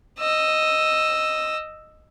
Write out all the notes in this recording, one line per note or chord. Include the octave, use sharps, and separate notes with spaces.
D#5 E6